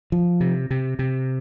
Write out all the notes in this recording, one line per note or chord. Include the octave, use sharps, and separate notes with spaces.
F3
C3
C3
C3